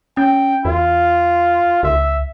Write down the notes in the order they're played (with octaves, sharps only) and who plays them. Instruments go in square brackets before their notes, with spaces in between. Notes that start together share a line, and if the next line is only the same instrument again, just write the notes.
[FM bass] C#4 [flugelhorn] G5
[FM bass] E2 [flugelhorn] F4
[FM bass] C#2 [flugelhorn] E5